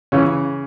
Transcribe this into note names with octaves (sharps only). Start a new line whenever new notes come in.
C#3 E3 C#4